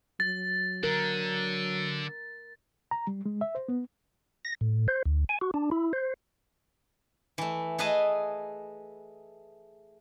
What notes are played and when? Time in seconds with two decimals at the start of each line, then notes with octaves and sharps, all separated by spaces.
0.20 F#3 A6
0.84 D3 A#4
2.91 A#5
3.07 G3
3.26 G#3
3.41 E5
3.55 C5
3.69 B3
4.45 A#6
4.61 A2
4.88 C5
5.06 D2
5.29 G#5
5.41 F#4
5.54 D4
5.71 E4
5.93 C5
7.38 E3 A3
7.78 A3 G#4 B4 D#5 G#5 A5